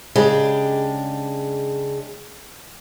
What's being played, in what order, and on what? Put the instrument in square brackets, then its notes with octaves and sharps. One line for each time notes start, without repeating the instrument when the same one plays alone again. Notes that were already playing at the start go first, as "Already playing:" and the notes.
[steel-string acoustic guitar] C#3 G#3 D4 G4